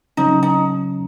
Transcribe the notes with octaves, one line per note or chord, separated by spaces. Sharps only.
C#3 F#3 C#4 D#4
D#4